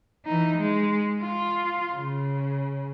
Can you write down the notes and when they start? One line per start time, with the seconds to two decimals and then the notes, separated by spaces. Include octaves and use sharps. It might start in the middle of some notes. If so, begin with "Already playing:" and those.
0.26 E3 D#4
0.57 G#3
1.22 F4
1.95 C#3